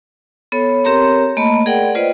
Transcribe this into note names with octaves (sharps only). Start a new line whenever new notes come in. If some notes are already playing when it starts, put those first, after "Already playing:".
B3 A4 C#5
C4 G4 A#4 C#5 A#5 C6
A3 A#3 D#5 A5 B5
G#4 A#4 D5 F#5 G5
F4 B4 C5 D5 D#5